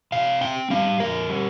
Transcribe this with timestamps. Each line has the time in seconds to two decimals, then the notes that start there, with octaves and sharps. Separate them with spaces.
0.12 C3 F5
0.41 C4 G5
0.70 G3 F5
1.00 F2 A#4
1.29 G3